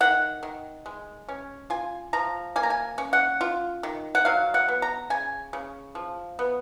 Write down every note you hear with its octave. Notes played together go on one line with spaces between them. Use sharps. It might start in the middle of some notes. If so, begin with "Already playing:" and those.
D#3 F#5
D#3
G#3
C#4
F4 G#5
F3 A#5
A#3 G#5
A#5
G#5
C#4
F#5
F4
D#3
F#5
F#3 F5
F#5
B3
A#5
C#3 G#5
C#3
F3
B3